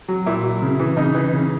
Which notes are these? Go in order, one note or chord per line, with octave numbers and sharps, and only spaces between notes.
F#3
A#2 E4
F#3
C#3
E3
C#3 D#4
E3
C#3